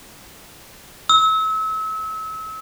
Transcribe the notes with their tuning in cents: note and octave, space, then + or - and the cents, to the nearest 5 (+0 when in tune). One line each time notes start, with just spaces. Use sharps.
E6 -35